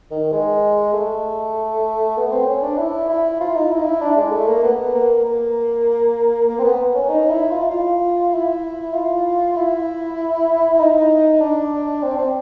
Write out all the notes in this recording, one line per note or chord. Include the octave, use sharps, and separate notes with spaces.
D#3
G#3
A3
B3
C4
C#4
D4
E4
E4
F4
D#4
E4
D#4
E4
D4
G#3
A3
A#3
B3
A#3
A#3
A#3
C4
B3
C#4
D#4
E4
F4
F4
E4
F4
E4
D#4
D4
C4
C4